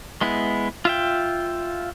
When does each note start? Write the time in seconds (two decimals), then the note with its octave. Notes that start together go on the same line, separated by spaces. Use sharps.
0.21 G#3 B3 E4
0.85 F4 E5 G5